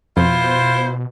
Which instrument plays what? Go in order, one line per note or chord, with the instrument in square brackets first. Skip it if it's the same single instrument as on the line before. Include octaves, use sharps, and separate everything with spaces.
[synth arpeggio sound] F2 [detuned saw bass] B2 [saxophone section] E4 F4 C5